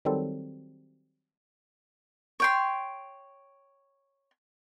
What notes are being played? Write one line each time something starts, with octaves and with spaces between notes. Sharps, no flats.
D#3 F#3 G3 C4 A4
C#5 G5 C6